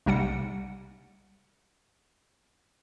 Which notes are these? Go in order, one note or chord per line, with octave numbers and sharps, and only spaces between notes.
B1 C3 G3 F#5 C#7